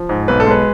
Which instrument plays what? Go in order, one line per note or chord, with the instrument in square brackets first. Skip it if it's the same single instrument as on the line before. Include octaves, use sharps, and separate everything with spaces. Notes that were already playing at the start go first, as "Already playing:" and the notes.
Already playing: [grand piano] F3
G#2
B1 B4
A4
G#3 B4